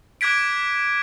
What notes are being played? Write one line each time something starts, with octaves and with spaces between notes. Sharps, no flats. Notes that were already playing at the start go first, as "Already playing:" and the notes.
D6 F#6 G#6 B6 D7